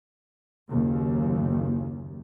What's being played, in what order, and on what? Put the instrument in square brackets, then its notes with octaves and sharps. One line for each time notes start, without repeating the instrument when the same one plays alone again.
[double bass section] F#1 D#2